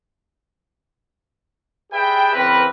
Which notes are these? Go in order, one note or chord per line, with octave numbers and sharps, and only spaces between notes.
G4 G#4 B4 D5 E5 G5
C#3 E3 C4 A#4 B4